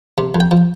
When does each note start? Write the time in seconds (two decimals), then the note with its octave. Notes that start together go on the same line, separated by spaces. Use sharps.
0.18 C3
0.35 F2
0.40 G5
0.51 F3